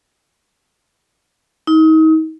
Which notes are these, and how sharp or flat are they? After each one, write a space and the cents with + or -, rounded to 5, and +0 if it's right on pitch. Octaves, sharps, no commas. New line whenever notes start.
D#4 +35